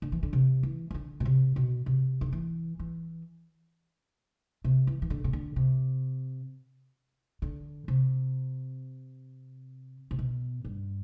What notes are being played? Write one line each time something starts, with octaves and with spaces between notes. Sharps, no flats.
D3
E3
D3
C3
E3
E3
D3
B2
C3
B2
C3
D3
E3
E3
C3
E3
E3
D3
C3
D3
C3
D3
C3
C3
B2
G2